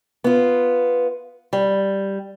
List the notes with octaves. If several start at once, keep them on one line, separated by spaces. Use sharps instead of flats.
B3 F4
G3